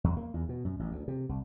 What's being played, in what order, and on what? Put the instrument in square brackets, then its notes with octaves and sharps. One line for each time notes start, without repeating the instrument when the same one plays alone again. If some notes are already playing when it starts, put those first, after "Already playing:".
[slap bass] E2
A#3
E2
B2
F#2
A1
D2
C3
C2